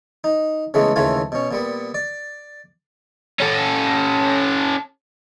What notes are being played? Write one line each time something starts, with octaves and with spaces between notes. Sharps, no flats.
D#4
C#3 E3 G#3 A3 B3
D#2 C#3 E3 A3 F4 G#5
B2 C#4
A#2 G3 B3
D5
C#4 A4